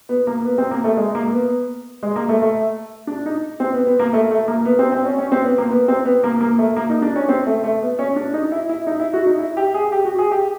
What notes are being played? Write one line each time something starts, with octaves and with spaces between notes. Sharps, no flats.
B3
A#3
B3
C4
A#3
A3
G#3
A#3
B3
G#3
A#3
A3
A3
D4
D#4
C4
B3
B3
A#3
A3
A3
A#3
B3
C4
C4
C#4
C#4
C4
B3
A#3
B3
C4
B3
A#3
A#3
A3
A#3
D#4
D4
C#4
C4
A3
A3
B3
C#4
D4
D#4
E4
E4
D#4
E4
F#4
D#4
E4
G4
G#4
G4
F#4
G#4
G4